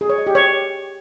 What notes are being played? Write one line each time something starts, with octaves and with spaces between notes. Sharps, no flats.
G#4
C#5
D#5
G4
C#5